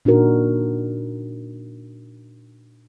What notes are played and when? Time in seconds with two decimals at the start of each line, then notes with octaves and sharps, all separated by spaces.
0.05 A#2 D4 D#4 F#4 A#4